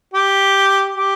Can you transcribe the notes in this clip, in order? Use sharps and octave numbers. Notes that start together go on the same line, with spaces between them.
G4
G4